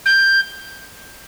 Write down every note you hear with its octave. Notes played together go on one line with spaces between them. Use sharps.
G6